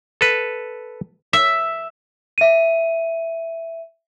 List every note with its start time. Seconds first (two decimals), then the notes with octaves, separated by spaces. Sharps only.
0.21 A4 B4
1.33 E5
2.38 E5 D#7